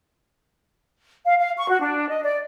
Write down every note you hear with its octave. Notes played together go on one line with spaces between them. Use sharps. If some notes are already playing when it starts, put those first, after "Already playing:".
F5
F5
C#6
F#4
D4
D#5
D5